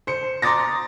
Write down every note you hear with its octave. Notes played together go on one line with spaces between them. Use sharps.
C5 C#7
A#5 C6 D6 D#6 A6 A#6